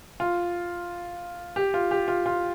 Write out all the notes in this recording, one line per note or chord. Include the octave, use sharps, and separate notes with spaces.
F4
G4
F4
G4
F4
F4